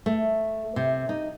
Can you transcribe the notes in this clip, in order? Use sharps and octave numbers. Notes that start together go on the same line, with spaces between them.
A3
C3
D#4